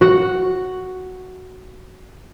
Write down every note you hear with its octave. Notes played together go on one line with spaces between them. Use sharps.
F#4 F#5